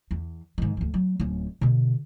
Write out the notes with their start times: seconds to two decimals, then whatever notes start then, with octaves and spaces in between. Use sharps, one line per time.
0.11 E2
0.58 G#2 D#3
0.77 D2 E3
0.94 F#3
1.20 D1 C#4
1.61 B2 D3